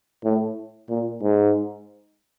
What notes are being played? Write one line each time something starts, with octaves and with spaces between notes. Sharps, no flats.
A2
A#2
G#2